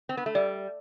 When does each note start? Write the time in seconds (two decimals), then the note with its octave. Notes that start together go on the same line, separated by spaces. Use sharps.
0.09 C4
0.17 B3
0.26 A3
0.35 G3 D5